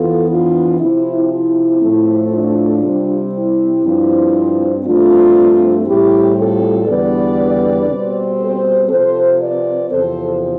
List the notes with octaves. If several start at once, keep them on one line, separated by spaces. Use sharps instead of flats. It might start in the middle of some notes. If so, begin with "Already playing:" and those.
Already playing: F2 E3 B3 F4 A4
D4 F4
C3 F3 C4 E4
E4
A2 F3 A3 C4
D4 F4
C3 G3 C4
E4
G2 F3 C4
G2 F3 A3 C4 D4 F4
A2 G3 C4 E4 G4
F4 A4
E2 D3 G3 B3 B4 D5
B2 G3 C4
A4 C5
C3 F3 C4 A4 C5
B4 D5
E2 C3 F3 C4 A4 C5